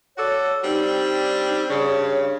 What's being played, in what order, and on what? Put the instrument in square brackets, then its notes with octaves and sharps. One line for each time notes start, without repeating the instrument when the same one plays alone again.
[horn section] F#4 A4 D5 [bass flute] C#5
[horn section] G3 C4 D4 [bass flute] D#4
[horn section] G2 C#3 [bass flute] C#5